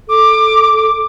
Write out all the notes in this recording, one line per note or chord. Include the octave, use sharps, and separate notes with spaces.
A4 D6